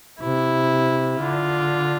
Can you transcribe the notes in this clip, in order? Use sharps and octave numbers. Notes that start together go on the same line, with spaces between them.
C3 E4
D3 F4